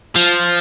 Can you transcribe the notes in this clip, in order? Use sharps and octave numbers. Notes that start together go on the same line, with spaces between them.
F3